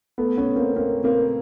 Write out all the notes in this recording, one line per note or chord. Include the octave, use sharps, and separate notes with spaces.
A3 B3
B3 C#4
A#3 C4
A#3 C4
A#3 C4